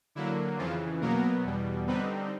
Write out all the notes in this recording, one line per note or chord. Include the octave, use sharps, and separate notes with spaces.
D3 F#3 A#3 E4
F2 C#3 E3 F3 F4
B2 F#3 A#3 B3 A#4
E2 B2 G3
D3 G3 B3 C4 D#4 B4